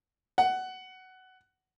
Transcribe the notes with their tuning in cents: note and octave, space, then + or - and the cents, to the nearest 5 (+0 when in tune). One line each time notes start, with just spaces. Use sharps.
F#5 +15